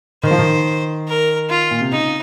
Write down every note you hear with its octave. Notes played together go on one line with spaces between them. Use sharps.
D#3 C5
F3
D#3
A#4
F4
A#2
C3
C#3 D#4